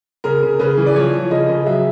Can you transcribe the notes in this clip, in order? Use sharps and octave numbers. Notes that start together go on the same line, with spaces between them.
C#3 A#4
C#3
C#3 B4
E3
D5
F3 C#5
F3
C#3 D#5
C#3
F#3 E5